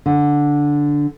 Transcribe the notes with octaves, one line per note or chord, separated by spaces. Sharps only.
D3